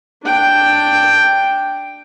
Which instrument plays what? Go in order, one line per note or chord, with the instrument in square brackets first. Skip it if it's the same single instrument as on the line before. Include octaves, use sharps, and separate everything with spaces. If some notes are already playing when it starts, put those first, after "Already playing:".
[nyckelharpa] D4 G5